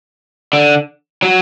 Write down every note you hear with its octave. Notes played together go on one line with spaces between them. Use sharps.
D3
F#3